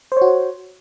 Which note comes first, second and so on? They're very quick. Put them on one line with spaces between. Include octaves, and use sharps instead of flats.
C5 C#5 F#4